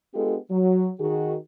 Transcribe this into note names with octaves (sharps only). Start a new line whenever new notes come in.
G#3 B3 D4 F4 G4 A4
F#3
D#3 F#4 G#4